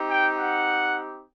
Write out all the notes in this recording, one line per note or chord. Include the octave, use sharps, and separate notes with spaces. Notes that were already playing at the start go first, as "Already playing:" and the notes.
Already playing: C4 D#4 G4
G5
F#5